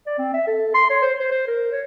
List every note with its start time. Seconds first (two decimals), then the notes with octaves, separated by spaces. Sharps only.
0.06 D5
0.19 C4
0.33 E5
0.47 A4
0.74 C6
0.90 C#5
1.02 C5
1.19 C5
1.32 C5
1.47 A#4
1.72 C#5